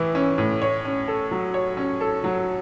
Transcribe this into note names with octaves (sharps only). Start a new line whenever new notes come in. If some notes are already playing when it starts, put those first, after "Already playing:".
Already playing: A2 E3 E4
C#4
A2
C#5
C#4
A4
F#3
C#5
C#4
A4
F#3